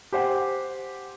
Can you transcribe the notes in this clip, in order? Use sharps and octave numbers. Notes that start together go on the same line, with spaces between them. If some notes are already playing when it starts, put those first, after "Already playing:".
G4 C5 F#5 G#5